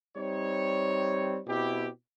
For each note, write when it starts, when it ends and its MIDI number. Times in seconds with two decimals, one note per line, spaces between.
0.17 1.39 55
0.17 1.39 60
0.17 1.39 63
0.17 1.39 73
1.47 1.88 47
1.47 1.88 60
1.47 1.88 64
1.47 1.88 67